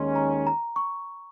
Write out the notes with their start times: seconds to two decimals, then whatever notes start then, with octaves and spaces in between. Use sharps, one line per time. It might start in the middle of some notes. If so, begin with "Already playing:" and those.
Already playing: D#2 D#3 G#3 C#4 C6
0.16 A#5
0.47 A#5
0.76 C#6